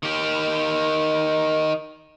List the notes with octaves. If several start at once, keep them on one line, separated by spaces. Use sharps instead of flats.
D#3 G4